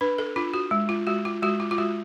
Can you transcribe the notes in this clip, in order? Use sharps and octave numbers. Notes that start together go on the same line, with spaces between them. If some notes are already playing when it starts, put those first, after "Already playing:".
D4 B4
A4
D4 F4
F#4
G#3
F4
G#3 F#4
F4
G#3 F#4
F4
F4
G#3 F#4